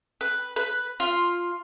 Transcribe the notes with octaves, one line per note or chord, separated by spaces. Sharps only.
B4
B4
F4